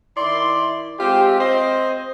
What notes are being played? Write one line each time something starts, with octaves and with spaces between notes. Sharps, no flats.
D#3 E4 D5 C6
G#3 C4 F4 G4
C4 C5 D#5